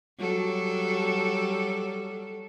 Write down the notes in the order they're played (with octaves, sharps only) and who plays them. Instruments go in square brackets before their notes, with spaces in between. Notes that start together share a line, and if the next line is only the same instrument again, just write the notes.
[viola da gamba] F#3 G3 A4